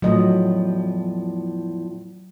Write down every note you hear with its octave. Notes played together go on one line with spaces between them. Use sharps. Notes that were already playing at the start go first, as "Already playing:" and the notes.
E2 A2 F3 F#3 D#5